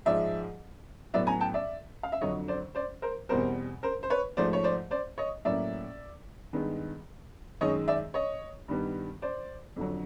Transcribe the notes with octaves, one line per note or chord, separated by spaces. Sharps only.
G#2 F3 G#3 D5 E5
A2 F#3 B3 D5 E5
G#5 A#5
G5 A5
D5 E5
F5
E5
F2 D3 F#3 C#5 D#5
C5 D5
C5 D5
A#4 C5
E2 B2 G3 C4 A#4 C5
A#4 C5
C5
B4 C#5
G#2 F3 A3 C5 D5
C#5
C5 D5
C5 D5
C#5 D#5
A2 F#3 A#3 C#4 D5 E5
G2 D#3 G#3 B3
F#2 D#3 G#3 C#5 D#5
D5 E5
C#5 D#5
G2 D#3 G3 B3
C5 D5
F2 D3 F#3